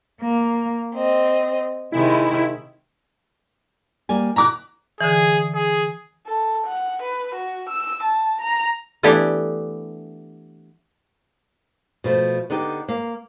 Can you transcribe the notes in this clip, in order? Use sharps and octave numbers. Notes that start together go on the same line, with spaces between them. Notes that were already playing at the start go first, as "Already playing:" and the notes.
A#3
C4 D#5
C3 D#3 G#3 E4
G3 A#3 G#5
B2 E4 E5 A#5 D6 F#6
D3 E3 G#4
G#4
A4
F#5
B4
F#4
E6
A5
A#5
E3 A3 B3 D4 E4 G4
B2 F3 A3
D3 B3 D#4 G4
A#3 F5